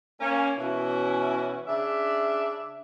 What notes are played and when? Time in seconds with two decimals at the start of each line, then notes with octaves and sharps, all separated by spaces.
0.20 A#3 C#4
0.58 B2 E3 C#4 E4 F#4
1.67 C#3 D4 E5